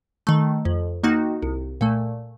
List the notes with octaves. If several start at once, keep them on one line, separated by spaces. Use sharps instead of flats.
D#3 A3
F2
D#3 A#3 D#4 F#4
C2
A#2 A3